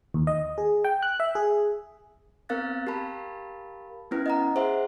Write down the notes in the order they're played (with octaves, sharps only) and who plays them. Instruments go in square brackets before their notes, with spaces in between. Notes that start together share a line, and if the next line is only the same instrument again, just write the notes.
[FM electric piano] D#2
D#5
G#4
G5
F#6
E5
G#4
[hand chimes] B3 C4 A#4 F5 F#6 A6
G4 A#4 F5 A5 B5
B3 C#4 E4 B4
D#5 F#5 A#5
G#4 C5 E5 F#5 C6